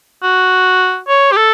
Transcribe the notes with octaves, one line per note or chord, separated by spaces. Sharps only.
F#4
C#5
G4
A4